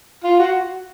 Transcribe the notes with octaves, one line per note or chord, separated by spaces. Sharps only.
F4
F#4